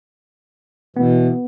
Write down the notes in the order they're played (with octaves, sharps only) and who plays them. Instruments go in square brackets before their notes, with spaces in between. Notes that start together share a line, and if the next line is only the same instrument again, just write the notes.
[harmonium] B2 E3 [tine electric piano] B3